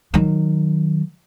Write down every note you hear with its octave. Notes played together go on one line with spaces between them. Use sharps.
D#3 F#3